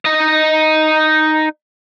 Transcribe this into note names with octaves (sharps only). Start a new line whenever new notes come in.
D#4 D#5